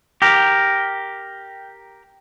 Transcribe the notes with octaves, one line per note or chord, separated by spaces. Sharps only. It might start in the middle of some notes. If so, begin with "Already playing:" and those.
G4 A#4